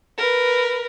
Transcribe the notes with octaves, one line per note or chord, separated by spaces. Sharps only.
A#4 B4